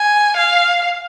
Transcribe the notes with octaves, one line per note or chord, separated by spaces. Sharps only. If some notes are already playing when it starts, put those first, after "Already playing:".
Already playing: G#5
F5